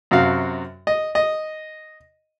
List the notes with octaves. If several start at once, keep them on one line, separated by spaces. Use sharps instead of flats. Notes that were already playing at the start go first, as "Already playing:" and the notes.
F#2 C3 F#4 F5
D#5
D#5